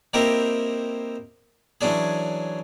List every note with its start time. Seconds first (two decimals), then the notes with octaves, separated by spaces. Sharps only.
0.14 A#3 C4 D#4 E4 G4 A#4
1.81 E3 F#3 C#4 D4 G#4